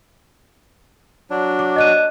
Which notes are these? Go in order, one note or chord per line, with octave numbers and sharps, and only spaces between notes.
F#3 D4
D6
D#5 F#6 D#7